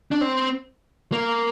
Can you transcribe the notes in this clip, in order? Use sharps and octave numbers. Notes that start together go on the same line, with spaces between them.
D4
C4
A#3